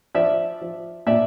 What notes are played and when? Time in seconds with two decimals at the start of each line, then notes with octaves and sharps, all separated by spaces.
0.15 F3 D5 E5
0.61 F3
1.06 A#2 D5 E5